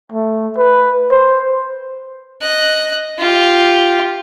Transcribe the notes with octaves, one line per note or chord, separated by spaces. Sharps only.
A3
B4
C5
D#5 F#6
F4 G4